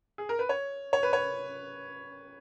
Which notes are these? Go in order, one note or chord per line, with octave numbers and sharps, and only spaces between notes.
G#4
A#4
B4
C#5
C#5
B4
C#5